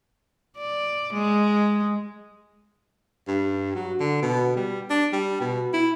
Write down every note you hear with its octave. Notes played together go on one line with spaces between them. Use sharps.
D5
G#3
G2
F#3
D3
B2
G3
D4
G3
B2
E4